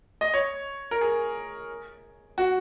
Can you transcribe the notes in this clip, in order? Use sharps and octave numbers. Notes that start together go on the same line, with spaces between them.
D#5
C#5
A#4
G#4
F#4